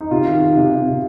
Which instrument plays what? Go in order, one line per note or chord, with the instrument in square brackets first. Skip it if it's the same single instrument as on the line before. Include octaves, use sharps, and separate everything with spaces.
[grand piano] D#4
[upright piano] C3 [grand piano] F4
[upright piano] D#3
D#3
C3
C3
C3